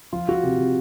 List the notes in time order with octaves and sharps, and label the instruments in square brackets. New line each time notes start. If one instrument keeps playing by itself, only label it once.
[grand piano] F3 F4
F3 F#4
C3 G4
C3